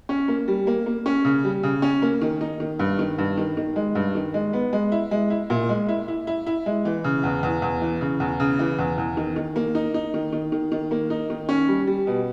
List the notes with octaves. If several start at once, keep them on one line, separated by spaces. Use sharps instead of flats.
C#4
A#3
G3
A#3
A#3
C#4
C#3
G3
C#3
C#4
A#3
D#3
D#4
D#3
G2
D#3
G2
D#3
D#3
G#3
G2
D#3
G#3
B3
G#3
E4
G#3
E4
A#2
G#3
E4
E4
E4
E4
G#3
E3
C#3
E2
E2
E2
E3
C#3
E2
C#3
E3
E2
E2
D#3
D#3
A#3
D#4
D#4
D#3
D#3
D#3
D#3
A#3
D#4
D#3
C#4
G3
G3
B2